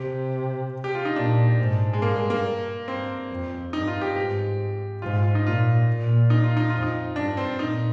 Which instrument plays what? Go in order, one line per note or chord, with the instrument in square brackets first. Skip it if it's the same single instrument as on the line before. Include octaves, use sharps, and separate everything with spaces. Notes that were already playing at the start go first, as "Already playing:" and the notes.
Already playing: [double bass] C3 [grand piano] G4
[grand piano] G4
F4
D#4
[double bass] A#2 [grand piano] D4
[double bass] G#2
[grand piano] G#3
[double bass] G2 [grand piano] A#3
[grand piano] G#3
A#3
[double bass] G2 [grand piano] C4
[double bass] F2
[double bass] G2 [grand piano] D#4
[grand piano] F4
G4
[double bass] G#2 [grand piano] G4
[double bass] G#2 [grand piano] F4
[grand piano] F4
D#4
[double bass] A#2 [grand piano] F4
[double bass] A#2
[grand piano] D#4
F4
D#4
[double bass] F2 [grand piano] F4
[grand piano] D#4
[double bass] G2 [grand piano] D4
[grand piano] C4
[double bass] A#2 [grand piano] D#4